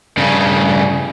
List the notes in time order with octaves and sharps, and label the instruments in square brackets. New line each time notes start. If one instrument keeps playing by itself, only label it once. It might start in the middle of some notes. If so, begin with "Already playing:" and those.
[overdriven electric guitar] G2 C#3